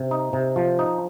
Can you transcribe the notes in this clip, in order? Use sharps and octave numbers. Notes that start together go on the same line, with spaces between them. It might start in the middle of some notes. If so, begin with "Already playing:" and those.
Already playing: C3
D#4
C3
F3
D#4